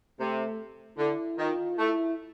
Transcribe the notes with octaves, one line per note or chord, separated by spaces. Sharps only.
C3 A3
D3 E4
D#3 F4
A3 E4